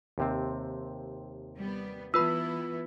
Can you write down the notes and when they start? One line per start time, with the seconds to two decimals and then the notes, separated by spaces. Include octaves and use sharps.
0.18 D#2 C3 C4
1.58 G3 B3
2.14 E3 B3 E4 F4 B4 B5 E6